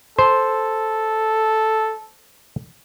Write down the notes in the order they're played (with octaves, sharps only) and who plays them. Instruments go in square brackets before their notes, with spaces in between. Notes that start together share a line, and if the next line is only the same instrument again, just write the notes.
[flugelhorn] A4 [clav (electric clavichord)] C5